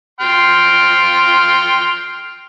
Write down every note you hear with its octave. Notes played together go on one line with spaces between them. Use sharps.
G5 C6 F6